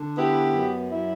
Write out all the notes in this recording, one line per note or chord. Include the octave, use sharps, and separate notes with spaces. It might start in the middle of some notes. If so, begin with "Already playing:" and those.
Already playing: D3
B3 E4 G4
F#2
F#3 E4